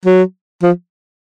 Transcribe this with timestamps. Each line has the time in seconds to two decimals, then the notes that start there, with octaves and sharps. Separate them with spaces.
0.05 F#3
0.62 F3